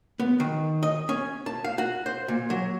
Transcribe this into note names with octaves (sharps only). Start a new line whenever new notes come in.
B3
D#3
D#5
C#4
A5
F5
F#4
C5
A#2
F#3